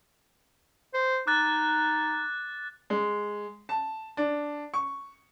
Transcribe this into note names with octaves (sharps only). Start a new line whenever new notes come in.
C5
D#4 D6 F#6 A6
G#3
A5
D4
C#6